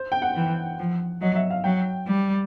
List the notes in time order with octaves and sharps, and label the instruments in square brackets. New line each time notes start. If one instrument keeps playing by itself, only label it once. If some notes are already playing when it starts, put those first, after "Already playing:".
Already playing: [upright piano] C5
G5
F#5
[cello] E3
F3
[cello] F#3 [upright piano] D#5
[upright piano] E5
F5
[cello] F#3 [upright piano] G5
[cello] G3